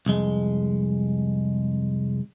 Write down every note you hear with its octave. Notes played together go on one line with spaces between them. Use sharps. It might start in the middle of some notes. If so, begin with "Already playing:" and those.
C2 F2 G#3